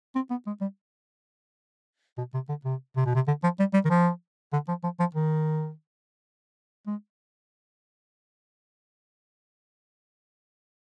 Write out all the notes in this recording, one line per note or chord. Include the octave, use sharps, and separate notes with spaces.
C4
B3
G#3
G3
B2
C3
D3
C3
C3
B2
C3
D3
F3
G3
G3
D#3
F3
D3
F3
F3
F3
D#3
G#3